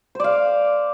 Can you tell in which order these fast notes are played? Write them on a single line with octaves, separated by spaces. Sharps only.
C5 D5 F5